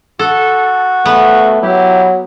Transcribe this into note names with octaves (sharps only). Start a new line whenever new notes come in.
F#4 A4
A3 B3
F#3 E4 G4